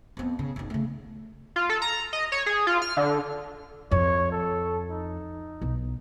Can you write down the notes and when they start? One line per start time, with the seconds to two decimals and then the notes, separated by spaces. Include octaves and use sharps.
0.17 F2 B3
0.39 C#3
0.56 F#1 B1
0.70 C#3 A3
1.56 F4
1.70 A4
1.82 A#5
2.13 D#5
2.32 C#5
2.46 G#4
2.67 F4
2.82 F6
2.97 D3
3.91 F2 C#5
4.32 A4
4.90 D#4
5.61 B1